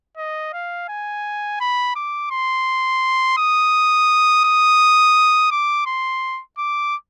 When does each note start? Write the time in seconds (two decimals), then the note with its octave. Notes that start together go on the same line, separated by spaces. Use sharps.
0.17 D#5
0.53 F5
0.89 G#5
1.61 B5
1.96 D6
2.31 C6
3.38 D#6
4.45 D#6
5.51 D6
5.87 C6
6.58 D6